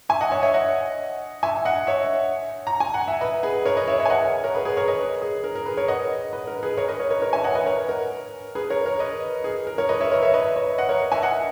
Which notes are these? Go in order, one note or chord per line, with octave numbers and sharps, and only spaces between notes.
E5 G#5
D#5 F#5
C#5 E5
C#5 E5
D#5 F#5
E5 G#5
D#5 F#5
C#5 E5
A#5
G#5
F#5
E5
B4 D#5
G#4 B4
A#4 C#5
B4 D#5
C#5 E5
C#5 E5
G#5
D#5 F#5
A#4 C#5
G#4 B4
G#4 B4
A#4 C#5
B4 D#5
G#4
A#4
A#4
G#4 B4
A#4 C#5
D#5 F#5
B4 D#5
A#4
G#4 B4
A#4 C#5
B4 D#5
A#4 C#5
A#4 C#5
A#4 C#5
E5 G#5
D#5 F#5
B4 D#5
A#4 C#5
A#4
G#4 B4
A#4 C#5
A#4 C#5
B4 D#5
G#4
A#4
A#4 C#5
B4 D#5
C#5 E5
A#4 C#5
C#5 E5
B4 D#5
C#5 E5
D#5 F#5
A#4 C#5
E5 G#5
D#5 F#5